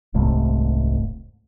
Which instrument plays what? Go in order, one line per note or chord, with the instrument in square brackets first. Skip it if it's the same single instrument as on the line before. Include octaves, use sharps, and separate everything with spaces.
[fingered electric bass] D#1 C2 G#2 A3